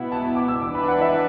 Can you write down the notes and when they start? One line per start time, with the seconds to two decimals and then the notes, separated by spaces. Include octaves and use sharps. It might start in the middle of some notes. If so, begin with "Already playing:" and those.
Already playing: B2 B3 E4 F#5
0.12 A5
0.22 B5
0.35 D6
0.48 E6
0.61 E3 D4 B4 D6
0.75 B5
0.88 F#5
1.01 E5